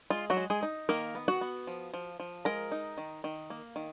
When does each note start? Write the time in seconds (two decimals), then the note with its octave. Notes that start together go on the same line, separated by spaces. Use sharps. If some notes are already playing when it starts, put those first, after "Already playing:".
0.10 G#3 F4
0.30 F#3 F#4
0.37 G#3
0.50 G#3 G#4
0.63 D#4
0.89 D#3 A#3 A#4
1.15 B3
1.28 F#4 F#5
1.41 B3
1.67 F3
1.94 F3
2.20 F3
2.45 G#3 A#4 A#5
2.72 D#4
2.98 D#3
3.24 D#3
3.50 A#3
3.76 D#3